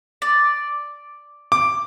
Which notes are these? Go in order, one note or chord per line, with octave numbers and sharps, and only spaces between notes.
D5
D6